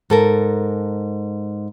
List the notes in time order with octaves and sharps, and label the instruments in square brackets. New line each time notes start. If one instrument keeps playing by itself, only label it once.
[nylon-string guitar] G#2 A4 A#4